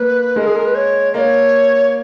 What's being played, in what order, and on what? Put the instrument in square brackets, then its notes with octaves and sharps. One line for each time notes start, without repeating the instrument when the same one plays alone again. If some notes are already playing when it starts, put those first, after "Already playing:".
Already playing: [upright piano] A#3 [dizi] B4
[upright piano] G#3 [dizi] A#4
[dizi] G#4
A#4
B4
C#5
[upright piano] A#3 [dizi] C#5 D#5